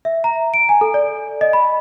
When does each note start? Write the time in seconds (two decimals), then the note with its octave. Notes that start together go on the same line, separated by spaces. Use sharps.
0.05 E5
0.24 A#5
0.54 D7
0.69 G#5
0.81 A4
0.94 D5
1.41 D#5
1.53 B5